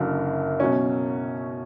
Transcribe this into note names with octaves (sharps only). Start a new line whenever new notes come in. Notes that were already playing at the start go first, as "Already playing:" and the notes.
Already playing: F#1 F#2 D3
B2 F#3 C#4